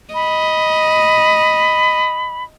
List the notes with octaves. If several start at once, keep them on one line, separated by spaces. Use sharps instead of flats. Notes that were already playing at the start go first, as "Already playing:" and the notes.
D#5 B5